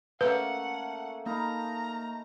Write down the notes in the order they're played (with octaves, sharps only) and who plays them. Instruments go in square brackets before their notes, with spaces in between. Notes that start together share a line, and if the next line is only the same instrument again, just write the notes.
[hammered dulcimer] A3 A#3 C#4 [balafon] B4 [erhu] F#5
[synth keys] A#3 [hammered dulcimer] D#4 F5 B5 [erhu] A#5